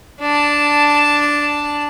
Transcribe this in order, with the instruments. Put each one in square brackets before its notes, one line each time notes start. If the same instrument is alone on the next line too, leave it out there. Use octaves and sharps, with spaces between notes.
[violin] D4 A5